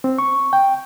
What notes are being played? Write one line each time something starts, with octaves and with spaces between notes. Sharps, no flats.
C4
C#6
G5